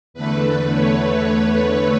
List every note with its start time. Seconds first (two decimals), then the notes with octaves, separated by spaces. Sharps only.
0.14 E2 D3 A3 B4
0.70 C#5